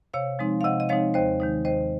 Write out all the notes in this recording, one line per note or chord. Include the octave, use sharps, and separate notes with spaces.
C3 C#5 F5
F3 G#3 C4 D#4
F5
C3 D#5 F#5
D#5
F3 G#3 C4 D#4 C#5 F5
D#2 C5 D#5
D#3 G#3 D#4
D#2 C5 D#5